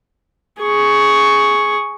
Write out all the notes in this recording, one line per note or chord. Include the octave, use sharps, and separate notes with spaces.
G#4 C#6